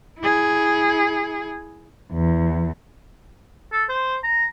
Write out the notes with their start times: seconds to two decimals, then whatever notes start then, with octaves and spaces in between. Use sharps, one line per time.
0.19 E4 G#4
2.12 E2
3.72 A4
3.89 C5
4.24 A#5